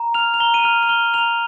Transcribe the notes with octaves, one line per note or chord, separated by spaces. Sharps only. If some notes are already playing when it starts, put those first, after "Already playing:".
Already playing: A#5
F6 F7
F7
A#5 G7
D#7
F6 F7
F7
F6 G7
A#5 F7